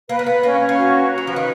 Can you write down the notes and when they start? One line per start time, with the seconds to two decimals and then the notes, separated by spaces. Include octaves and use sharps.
0.09 A#3 B4
0.19 A#3
0.26 B3 B4
0.43 A#3 C#4
0.61 C#4
0.69 A#3
0.78 F#4
0.94 B4
1.12 A#5
1.18 F#3
1.27 F3 B4
1.36 D#3